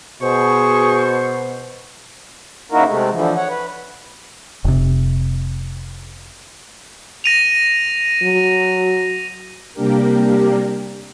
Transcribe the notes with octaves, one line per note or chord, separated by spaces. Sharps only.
B2 G#4 C5 C#6
C#3 A#3 D#4 E4 F#4 A#4
C3 G#3 A3
D3 E3 F3
C#5 F#5
B4
F1 C3
A#6 D#7 F7
F#3
C3 G3 A#3 D4 G4 A#4